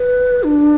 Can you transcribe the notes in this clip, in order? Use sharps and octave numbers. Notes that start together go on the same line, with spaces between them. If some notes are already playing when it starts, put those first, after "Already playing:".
Already playing: B4
D4